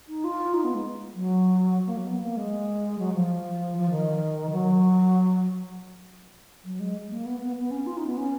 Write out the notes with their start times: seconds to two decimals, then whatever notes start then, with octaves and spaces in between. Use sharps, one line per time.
0.08 D#4
0.24 F4
0.54 D#4
0.64 B3
0.75 G#3
1.15 F#3
1.86 A#3
1.97 F#3
2.07 B3
2.22 A#3
2.37 G#3
2.98 F#3
3.13 F3
3.78 F3
3.90 D#3
4.51 F#3
6.65 F#3
6.80 G#3
7.10 A#3
7.25 B3
7.40 B3
7.56 B3
7.71 C#4
7.86 F4
7.97 D#4
8.06 B3
8.17 C#4